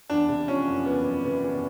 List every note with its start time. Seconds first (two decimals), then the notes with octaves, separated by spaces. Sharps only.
0.10 E2 D4
0.29 C3
0.48 F3 C#4
0.67 F#1
0.86 E2 B3
1.05 F#1
1.24 C3 B3
1.44 E2